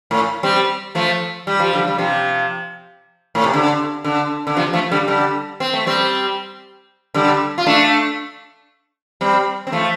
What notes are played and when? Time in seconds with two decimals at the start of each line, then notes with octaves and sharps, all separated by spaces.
0.11 A2
0.43 G3 C4
0.95 F3 A3
1.47 G3
1.60 F3
1.73 D3 G3
1.88 G3
1.98 C3 F3
3.35 A2
3.44 C3
3.54 D3
4.04 D3
4.47 D3
4.56 C3 F3
4.73 F3 A3
4.91 D3 G3
5.08 D3 G3
5.60 C4
5.73 A3
5.86 G3 C4
7.14 D3 G3
7.58 F4
7.66 A3 D4
9.21 G3 C4
9.67 C4
9.72 F3 A3